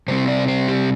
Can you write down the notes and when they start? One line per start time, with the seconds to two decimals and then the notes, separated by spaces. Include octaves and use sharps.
0.08 C3 G3 C4 C5
0.28 D5
0.48 C5
0.68 G4